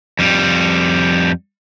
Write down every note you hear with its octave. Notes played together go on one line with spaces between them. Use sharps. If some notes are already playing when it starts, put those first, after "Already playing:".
F2 G3